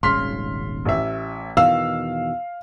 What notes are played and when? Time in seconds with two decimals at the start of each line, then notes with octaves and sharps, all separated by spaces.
0.03 D#1 G#1 C#3 C6 F6 B6
0.85 A1 E5
1.57 E2 B2 D#3 F5 E6